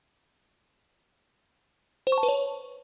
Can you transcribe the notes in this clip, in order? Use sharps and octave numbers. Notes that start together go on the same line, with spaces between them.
C5
C#6
A5
B4
C#5